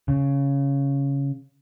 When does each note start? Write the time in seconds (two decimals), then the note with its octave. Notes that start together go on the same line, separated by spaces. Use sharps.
0.08 C#3